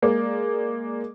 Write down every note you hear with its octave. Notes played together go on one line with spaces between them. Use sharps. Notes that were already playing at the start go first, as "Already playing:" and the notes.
G#3 A#3 D5